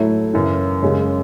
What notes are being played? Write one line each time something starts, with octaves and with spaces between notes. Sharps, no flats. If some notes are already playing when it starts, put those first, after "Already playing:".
Already playing: A2 F#3 A3 E4
F#2 C#3 E3
F#2 C#3 G#3